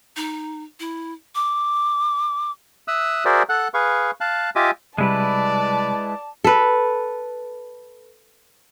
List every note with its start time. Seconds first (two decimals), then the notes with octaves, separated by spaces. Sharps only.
0.16 D#4
0.80 E4
1.35 D6
2.88 E5 D#6 E6 F#6
3.25 F#4 G#4 A#4 C5 D5 E5
3.49 A4 F#5 F#6
3.74 G#4 B4 F5 C#6
4.21 F5 A5 F#6
4.56 F4 G4 D#5 E5 G#5 D6
4.98 C3 G3 G#3 E4 B4 D5 A5
6.44 A4 B4